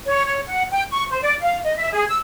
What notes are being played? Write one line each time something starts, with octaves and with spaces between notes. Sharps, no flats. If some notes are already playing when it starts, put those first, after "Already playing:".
C#5
C#5
F#5
G5
C#6
C5
D5
F5
D#5
E5
G#4
E6